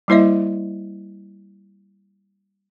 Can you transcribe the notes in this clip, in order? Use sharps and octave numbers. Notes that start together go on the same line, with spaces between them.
G3 A#3 E4 C5 D#5 E5